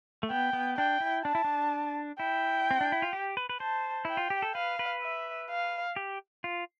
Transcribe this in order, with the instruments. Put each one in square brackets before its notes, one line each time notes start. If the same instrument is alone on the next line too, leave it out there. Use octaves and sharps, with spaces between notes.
[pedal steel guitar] A3
[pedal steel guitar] B3 [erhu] G5
[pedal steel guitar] B3
[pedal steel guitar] D4 [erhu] G5
[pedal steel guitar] E4
[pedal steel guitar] D4 [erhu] A5
[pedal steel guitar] E4
D4
[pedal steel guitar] E4 [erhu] G5
[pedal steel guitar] C4
D4
E4
F4
G4
B4
B4
[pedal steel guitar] C5 [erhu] A5
[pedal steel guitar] E4 [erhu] G5
[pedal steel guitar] F4
G4
A4
[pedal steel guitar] B4 [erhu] F5
[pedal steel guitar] B4
[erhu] E5
F5
[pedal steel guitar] G4
F4